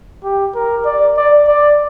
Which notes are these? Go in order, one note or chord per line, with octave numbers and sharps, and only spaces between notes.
G4
A#4
D5
D5
D5